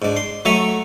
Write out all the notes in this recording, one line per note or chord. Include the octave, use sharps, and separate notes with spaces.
G#2 D4
C6
F#3 A3 E5 G#5 A#5 C#6